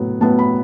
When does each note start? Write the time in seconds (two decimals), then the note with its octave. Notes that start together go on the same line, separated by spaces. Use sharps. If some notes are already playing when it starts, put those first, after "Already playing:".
Already playing: A2 F#3 B3
0.21 A2 F#3 B3 A5
0.39 B5